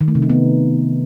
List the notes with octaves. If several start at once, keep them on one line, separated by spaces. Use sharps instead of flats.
D#3
A3
C3
D#4
B3